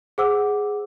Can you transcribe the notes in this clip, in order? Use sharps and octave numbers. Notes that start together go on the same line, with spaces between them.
G#4 C5 F#5 D6 E6